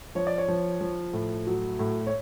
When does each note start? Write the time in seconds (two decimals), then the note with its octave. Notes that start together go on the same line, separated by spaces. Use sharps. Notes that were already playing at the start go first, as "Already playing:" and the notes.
0.15 F3 C#5
0.27 D5
0.38 C#5
0.48 F3
0.81 F3
1.13 A2
1.47 F#3
1.79 A2
2.07 C#5